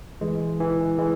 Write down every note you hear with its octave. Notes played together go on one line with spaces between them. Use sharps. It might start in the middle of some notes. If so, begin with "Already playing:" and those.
E3 G#3
E3
E3 G#3